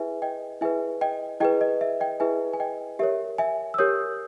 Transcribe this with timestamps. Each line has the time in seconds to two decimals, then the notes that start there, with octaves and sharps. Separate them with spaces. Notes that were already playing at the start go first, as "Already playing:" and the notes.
Already playing: E4 G#4 B4 E5 G#5
0.22 D#5 G5
0.61 E4 G#4 B4 E5 G#5
1.01 D#5 G5
1.40 E4 G#4 B4 D#5 G5
1.61 D#5
1.81 E5
2.00 D#5 G5
2.20 E4 G#4 B4 E5 G#5
2.53 G#5
2.60 D#5 G5
2.99 G4 A#4 C#5 E5
3.38 E5 G#5
3.74 E6
3.78 G4 A#4 C#5 D#6 G6